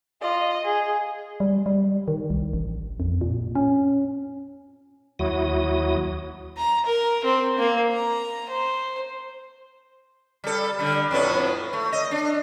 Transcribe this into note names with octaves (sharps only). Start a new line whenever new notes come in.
F4 D#5
G#4
G3
G3
D#3
C2
A1
F2
A#2
C#4
D#2 F#3 E4 F#4 D#6
A#5
A#4
C4
A#3
A#5
C5
G3 A4
D3 G3
F2 A2 B3
A3
D#5
D4